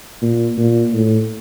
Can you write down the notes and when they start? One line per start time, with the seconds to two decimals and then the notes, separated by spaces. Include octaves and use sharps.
0.22 A#2
0.58 A#2
0.93 A2